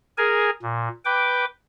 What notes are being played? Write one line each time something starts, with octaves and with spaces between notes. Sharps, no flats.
G#4 A#4 G#5
A#2
B4 G5 D6